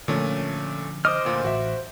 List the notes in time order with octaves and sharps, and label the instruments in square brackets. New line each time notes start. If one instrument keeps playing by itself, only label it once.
[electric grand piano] A#2 A3 C#4 [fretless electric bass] D3 F3
[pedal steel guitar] C5 D6 F6 [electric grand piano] D#5 D#6
[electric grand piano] D2 A#2
[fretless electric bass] A1 [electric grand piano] F#4 E5